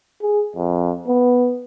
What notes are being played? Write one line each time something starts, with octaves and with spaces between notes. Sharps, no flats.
G#4
F2
B3